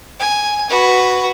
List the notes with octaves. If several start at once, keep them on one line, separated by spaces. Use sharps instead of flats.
G#5
F#4 B4